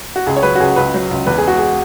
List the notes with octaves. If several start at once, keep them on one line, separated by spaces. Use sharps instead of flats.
F#4
C#2 G#4
C#5
F#3 B4
F#4
C#2 G#4
C#2 B4
F#3
C#2
E2 B4
G#4
G#3 F#4
G#4